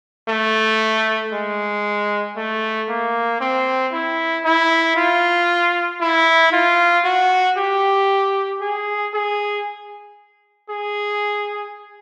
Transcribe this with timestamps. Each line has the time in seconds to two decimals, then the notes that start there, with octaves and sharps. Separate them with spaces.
0.29 A3
1.32 G#3
2.37 A3
2.89 A#3
3.41 C4
3.93 E4
4.45 E4
4.96 F4
6.01 E4
6.52 F4
7.05 F#4
7.57 G4
8.61 G#4
9.14 G#4
10.70 G#4